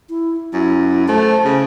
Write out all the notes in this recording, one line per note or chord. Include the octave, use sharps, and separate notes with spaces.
E4
F#2 E4
A3 C5
C#3